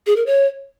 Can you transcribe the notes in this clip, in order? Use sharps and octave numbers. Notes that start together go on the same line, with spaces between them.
G#4
A#4
C#5